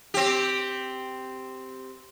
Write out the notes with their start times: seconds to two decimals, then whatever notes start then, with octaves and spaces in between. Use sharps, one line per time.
0.14 C4 G4